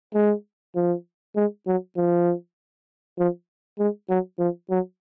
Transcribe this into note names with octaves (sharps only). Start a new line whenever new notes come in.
G#3
F3
G#3
F#3
F3
F3
G#3
F#3
F3
F#3